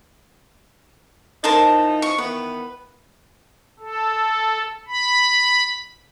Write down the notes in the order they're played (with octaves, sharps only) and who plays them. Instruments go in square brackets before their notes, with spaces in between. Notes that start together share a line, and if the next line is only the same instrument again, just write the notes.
[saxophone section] E3 F3 D#4 [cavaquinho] A#4 C5 A5
[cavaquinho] C#6
[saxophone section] D#3 E3 B3 [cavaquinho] B4
[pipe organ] A4
B5